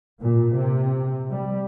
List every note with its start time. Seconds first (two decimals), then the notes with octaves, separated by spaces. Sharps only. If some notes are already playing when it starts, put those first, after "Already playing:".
0.21 A#2
0.54 C3
1.32 G3